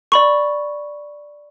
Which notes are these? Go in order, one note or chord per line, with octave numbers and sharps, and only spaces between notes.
D5 B5 C#6